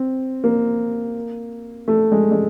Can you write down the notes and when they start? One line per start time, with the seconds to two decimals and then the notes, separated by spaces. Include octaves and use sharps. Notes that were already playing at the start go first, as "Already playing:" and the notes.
Already playing: C4
0.44 A#3
1.88 A3
2.12 G#3
2.31 G#3